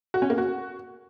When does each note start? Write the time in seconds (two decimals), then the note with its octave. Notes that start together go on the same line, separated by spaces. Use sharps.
0.14 F#4
0.22 C#4
0.30 A#3
0.38 F#4